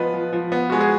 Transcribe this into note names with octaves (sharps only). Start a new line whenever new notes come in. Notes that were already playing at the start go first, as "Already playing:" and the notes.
Already playing: F3 B3 B4 D#5
F3
F3
B3
G#3 F#4
G#4